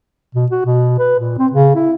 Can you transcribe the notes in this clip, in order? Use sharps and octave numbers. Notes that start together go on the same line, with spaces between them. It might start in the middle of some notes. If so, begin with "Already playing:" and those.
B2
F#4
B2
B4
A#2
C4
C#3
E4